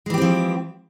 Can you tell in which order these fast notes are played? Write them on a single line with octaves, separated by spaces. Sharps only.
G#3 E3 G4 C4 F3